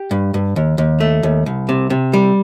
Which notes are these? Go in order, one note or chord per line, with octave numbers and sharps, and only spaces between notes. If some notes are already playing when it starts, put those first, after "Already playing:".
Already playing: G4
G2
G2
D#2
D#2
A3
D#2
C2
C3
C3
G3